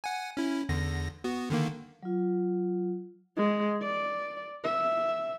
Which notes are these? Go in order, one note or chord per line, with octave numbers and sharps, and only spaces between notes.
F#5 G#5
C#4 E4
E2 D3 A#6
B3 F#4
D3 D#3 A#3
F#3 F4
G#3
D5
E5